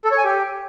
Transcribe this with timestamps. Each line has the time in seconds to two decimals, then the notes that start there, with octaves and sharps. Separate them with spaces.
0.05 A4
0.11 C#5
0.18 G#5
0.24 G4